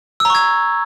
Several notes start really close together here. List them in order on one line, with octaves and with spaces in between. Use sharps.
E6 A#5 C#6 G#6